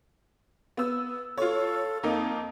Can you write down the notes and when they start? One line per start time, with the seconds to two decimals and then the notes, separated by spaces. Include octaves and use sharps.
0.77 B3 E6
1.37 F4 A4 C#5
2.03 F2 A#3 D#4 A#5